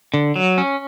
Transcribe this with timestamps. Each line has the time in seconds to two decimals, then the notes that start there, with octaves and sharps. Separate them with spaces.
0.14 D3
0.36 F#3
0.58 C#4